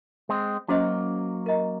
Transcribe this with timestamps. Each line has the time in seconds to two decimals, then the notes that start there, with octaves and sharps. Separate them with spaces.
0.29 G#3 C4
0.68 F#3 A#3 C#4 F#4 C5 D#5
1.46 A#4 D#5 A#5